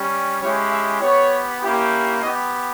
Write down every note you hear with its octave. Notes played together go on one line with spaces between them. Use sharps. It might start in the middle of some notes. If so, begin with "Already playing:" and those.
Already playing: G3 C#4 G4
G#3 C#4 E4 G4 C#5
E5
B3 G4 C#5
A#3 C#4 E4 G4
B3 G4 D#5